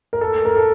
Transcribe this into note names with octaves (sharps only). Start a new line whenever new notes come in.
A#4
A4
A#4
A4